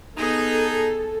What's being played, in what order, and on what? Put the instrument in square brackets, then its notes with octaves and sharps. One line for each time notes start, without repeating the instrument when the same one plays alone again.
[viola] B3 G#4 [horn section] D#4 [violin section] A4